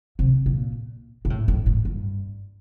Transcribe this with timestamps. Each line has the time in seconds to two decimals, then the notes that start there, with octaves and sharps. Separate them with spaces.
0.19 C3
0.46 A#2
1.25 A#2
1.30 A2
1.48 A2
1.66 A2
1.85 G2